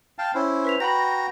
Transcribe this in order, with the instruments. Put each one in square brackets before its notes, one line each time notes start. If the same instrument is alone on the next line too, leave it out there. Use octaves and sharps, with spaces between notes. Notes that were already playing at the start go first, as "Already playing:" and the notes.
[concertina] F5 G5 A5
C#4 E4 C5
[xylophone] B4 B6 F7
[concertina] F#4 G5 A#5 [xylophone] B5 A#6